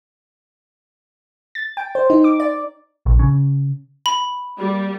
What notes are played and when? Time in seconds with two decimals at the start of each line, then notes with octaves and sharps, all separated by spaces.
1.55 A6
1.77 G5
1.95 C5
2.10 D#4
2.24 D6
2.40 D5
3.06 A#1
3.19 C#3
4.06 B5
4.59 G3 A#3